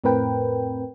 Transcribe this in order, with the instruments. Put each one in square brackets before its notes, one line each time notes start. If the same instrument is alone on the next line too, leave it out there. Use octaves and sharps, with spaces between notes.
[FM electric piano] F2 A2 C4 A#4 B4 G5